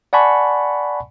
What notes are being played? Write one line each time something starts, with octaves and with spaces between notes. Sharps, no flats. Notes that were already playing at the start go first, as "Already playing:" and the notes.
D5 F#5 G#5 A5 B5 C#6